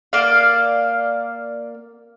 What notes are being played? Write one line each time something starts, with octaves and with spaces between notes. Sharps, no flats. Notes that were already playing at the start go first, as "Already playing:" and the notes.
A#3 D5 F5